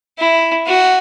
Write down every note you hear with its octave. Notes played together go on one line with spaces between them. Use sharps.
E4
F#4